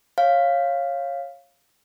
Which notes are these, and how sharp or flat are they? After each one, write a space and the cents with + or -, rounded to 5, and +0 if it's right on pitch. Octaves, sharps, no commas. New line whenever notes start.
C#5 -15 F5 +0